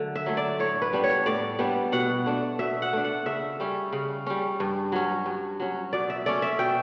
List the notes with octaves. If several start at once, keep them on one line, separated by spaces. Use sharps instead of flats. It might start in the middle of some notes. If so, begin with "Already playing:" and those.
Already playing: D3 F#3 A3
E5
F#3 A3
D5
A2 C#5
B4
G3 B3 D4
C#5
A2 D5
G3 B3 D4
B2 F#5
A3 D4
B2 E5
F#5
A3 D4
F#5
C#3 E5
G3 C#4
C#3
G3 C#4
G2
F#3 C#4
G2
F#3 C#4
B2 D5
E5
A3 C#4 D5
E5
B2 G5